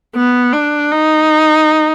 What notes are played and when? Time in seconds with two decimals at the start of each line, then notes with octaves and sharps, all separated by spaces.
0.15 B3
0.52 D4
0.91 D#4